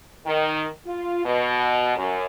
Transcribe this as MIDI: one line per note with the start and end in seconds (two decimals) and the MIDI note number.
0.25 0.66 51
0.86 1.22 65
1.25 1.95 47
1.96 2.26 42